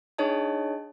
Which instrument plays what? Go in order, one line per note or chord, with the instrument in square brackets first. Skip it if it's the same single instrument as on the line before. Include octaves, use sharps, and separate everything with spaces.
[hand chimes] D4 D#4 G#4 C#5 D#5 A5